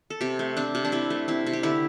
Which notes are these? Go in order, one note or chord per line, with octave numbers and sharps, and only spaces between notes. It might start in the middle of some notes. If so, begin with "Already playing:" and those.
A4
C3 G4
A3
C4 D4
C3
D4
C3 E4
A3
C4 E4
C3
G4
D3 E4